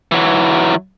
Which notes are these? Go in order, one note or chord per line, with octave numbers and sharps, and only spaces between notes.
E3 F#3